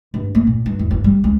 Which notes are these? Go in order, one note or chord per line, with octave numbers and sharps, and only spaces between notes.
G2
A#3
A#2
G2
E2
G1
G3
C#2